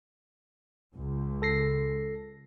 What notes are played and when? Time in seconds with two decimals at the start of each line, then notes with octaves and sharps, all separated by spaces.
0.94 C#2
1.42 A4 A#6 C7